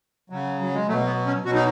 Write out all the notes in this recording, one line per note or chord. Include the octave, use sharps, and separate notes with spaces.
C#3 F#3
F#3
G#3
B2 F#3 A3
B3
C#4
B2 F#3 D#4 F#4